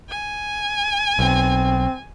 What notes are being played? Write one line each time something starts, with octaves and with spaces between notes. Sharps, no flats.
G#5
B1 C4